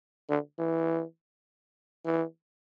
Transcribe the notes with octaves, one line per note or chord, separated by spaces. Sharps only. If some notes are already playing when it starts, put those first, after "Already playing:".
D3
E3
E3